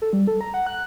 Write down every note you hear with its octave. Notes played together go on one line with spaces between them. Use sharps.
A4
G3
A4
A#5
F#5
F#6